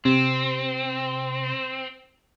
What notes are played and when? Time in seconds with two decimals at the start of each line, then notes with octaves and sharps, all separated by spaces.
0.05 C3 C4